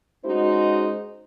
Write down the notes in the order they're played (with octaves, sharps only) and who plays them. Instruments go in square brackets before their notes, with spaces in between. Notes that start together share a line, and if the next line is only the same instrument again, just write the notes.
[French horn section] G#3 C#4 D#4 F#4 C5